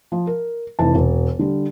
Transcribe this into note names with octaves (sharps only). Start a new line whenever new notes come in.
F3
A#4
F1 E3 A5
E1
D3 G3